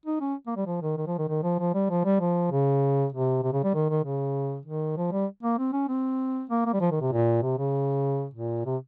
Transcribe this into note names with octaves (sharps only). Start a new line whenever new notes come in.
D#4
C#4
A#3
G3
F3
D#3
D#3
F3
D#3
D#3
F3
F3
G3
F3
G3
F3
C#3
C3
C3
C#3
G3
D#3
D#3
C#3
D#3
F3
G3
A#3
C4
C#4
C4
A#3
A#3
G3
F3
D#3
C3
A#2
C3
C#3
A#2
C3